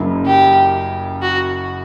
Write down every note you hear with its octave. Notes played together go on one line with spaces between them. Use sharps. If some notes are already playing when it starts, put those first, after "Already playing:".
Already playing: F#1 F#2 C#3
G4
F#4